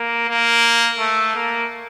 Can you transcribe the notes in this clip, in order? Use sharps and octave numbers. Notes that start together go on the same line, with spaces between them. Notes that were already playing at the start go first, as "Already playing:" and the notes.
Already playing: A#3
A#3
A3
A#3